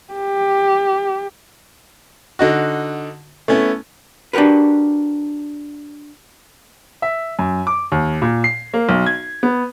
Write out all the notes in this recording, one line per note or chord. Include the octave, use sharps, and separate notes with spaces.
G4
D3 D#4 F#4
A3 B3 C#4 E4
D4 F#4 G4 A#4 B4
E5
F#2
D6
D#2
A#2
C7
A#3
B1
G#6
B3